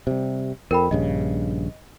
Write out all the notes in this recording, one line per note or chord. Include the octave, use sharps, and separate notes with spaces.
C3 G3
F2 A#4 G5 B5
A#1 G2 C#3 D#5